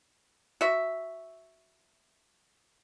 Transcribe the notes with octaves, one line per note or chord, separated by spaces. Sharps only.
F#4 E5